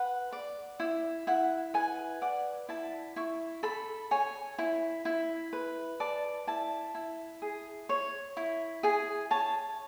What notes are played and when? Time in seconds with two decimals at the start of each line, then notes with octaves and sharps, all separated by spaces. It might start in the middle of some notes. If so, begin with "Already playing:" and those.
Already playing: B4 F#5
0.32 D5
0.80 E4
1.27 E4 F#5
1.74 B4 G#5
2.22 D5 F#5
2.69 E4 A5
3.16 E4 C#6
3.63 A4 B5
4.11 C#5 G#5
4.59 E4
5.05 E4
5.53 B4
6.00 D5 A5
6.47 E4 A5
6.95 E4
7.42 G#4
7.89 C#5
8.37 E4
8.83 G#4 G#5
9.31 C#5 A5